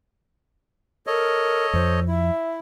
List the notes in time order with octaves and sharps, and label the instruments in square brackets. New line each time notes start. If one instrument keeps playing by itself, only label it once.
[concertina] A4 C#5 D#5 [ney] A#4
[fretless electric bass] F2 F3 [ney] C5
[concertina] E4 [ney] E5